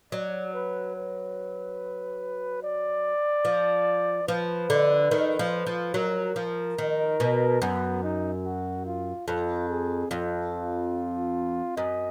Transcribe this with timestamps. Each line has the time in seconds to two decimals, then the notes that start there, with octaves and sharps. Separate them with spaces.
0.12 F#3 D5
0.53 B4
0.96 B4
2.62 D5
3.45 F3
4.28 F3 B4
4.70 D3
5.11 D#3
5.39 F3
5.67 F3
5.94 F#3 A#4
6.36 F3
6.78 D#3
7.20 B2
7.62 F#2 B3
8.03 D#4
8.45 F#4
8.85 F4
9.28 F2 F4
9.69 G#4
10.10 F2 F4
11.76 F#2 D#5